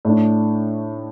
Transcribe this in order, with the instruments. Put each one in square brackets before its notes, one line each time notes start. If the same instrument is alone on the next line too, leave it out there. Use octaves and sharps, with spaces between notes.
[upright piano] A2 A3 D4